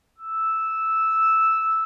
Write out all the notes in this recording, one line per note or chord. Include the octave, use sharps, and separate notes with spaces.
E6